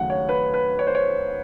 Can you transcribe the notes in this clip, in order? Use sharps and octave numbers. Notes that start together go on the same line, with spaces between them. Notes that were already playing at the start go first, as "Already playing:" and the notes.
Already playing: D#2 C#3 F#3 A3 F#5
C#5
B4
B4
C#5
C5
C#5